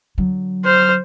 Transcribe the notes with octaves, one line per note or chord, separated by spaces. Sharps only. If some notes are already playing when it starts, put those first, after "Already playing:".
D3 F#3
C5 F6